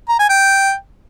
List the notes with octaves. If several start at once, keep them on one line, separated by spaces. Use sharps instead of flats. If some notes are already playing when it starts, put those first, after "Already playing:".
A#5
G#5
G5